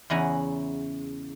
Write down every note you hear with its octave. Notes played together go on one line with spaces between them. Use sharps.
E2 C#3 E4 F#5 G#5 A#5